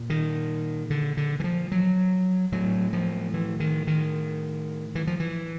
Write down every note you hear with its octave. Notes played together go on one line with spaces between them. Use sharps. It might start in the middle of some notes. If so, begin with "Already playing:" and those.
Already playing: A#2
D#3
D3
D3
E3
F3
F#3
A2 F#3
F3
E3
D#3
D#3
E3
F3
E3